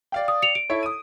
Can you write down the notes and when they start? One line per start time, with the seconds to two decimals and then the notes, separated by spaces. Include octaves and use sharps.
0.12 D5 F5 G5
0.28 D#6
0.42 C#7 F7
0.55 D7
0.70 E4 A4 C#5
0.83 D#6 D#7